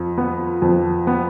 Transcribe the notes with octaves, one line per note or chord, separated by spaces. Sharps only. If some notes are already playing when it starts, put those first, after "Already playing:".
Already playing: F2
B3
F2
B3